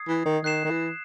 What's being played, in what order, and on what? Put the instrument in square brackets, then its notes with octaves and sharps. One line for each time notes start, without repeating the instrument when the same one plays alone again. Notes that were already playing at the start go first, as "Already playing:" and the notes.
Already playing: [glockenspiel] D#6 G#6 C7
[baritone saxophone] E3
D#3
[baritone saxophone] D#3 [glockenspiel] F#6 C7 E7
[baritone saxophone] D#3
E3